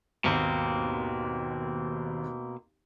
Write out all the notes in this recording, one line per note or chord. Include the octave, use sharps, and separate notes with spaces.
G#1 D#2 B2 A#3 C4